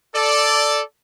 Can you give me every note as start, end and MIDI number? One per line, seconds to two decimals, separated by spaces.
0.13 0.80 69
0.13 0.80 74